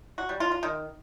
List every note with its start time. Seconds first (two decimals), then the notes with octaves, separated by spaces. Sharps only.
0.18 F#4
0.29 G3
0.40 F4
0.52 F4
0.63 D#3